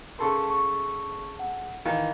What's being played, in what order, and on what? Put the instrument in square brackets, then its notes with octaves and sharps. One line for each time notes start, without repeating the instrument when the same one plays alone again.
[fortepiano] C#3 A4 C6 [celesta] A#4 A5 C#6
[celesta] C#6
F#5
[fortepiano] D#3 E3 [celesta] D#5 F5